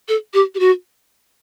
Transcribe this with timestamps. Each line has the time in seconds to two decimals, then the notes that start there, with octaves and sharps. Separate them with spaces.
0.08 A4
0.33 G4
0.54 G4
0.59 F#4